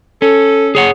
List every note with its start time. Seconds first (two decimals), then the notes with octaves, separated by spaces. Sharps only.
0.22 C#4 A4
0.75 G#4 C#5 F#5